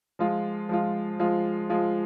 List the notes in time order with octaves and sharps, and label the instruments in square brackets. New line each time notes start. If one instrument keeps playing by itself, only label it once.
[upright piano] F3 G#3 F4
F3 G#3 F4
F3 G#3 F4
F3 G#3 F4